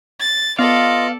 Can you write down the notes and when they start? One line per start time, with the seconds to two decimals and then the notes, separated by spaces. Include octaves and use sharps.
0.20 A6
0.59 B3 F4 A4 D5 D#5 F5